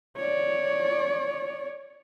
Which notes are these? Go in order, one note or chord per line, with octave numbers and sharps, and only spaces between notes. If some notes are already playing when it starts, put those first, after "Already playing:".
C#5 D5